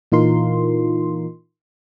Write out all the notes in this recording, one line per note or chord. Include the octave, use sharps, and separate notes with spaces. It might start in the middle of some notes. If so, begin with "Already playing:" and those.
A#2 E3 D#4 F4 A#4 C6